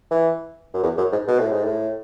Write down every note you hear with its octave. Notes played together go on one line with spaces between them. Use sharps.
E3
F#2
E2
F#2
G#2
B2
A2
G#2
A2